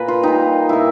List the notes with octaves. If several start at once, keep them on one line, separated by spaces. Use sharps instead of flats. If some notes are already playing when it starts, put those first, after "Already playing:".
Already playing: A#2 B4
F4
A#2 G3 D#4
A#2 G3 E4